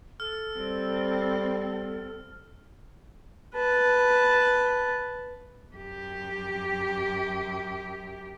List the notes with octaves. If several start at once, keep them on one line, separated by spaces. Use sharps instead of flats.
A4 F6
G3 C4
B4 A5
F#2 G4